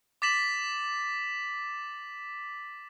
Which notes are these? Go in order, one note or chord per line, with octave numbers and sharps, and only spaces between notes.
D6 A6 B6 E7 F#7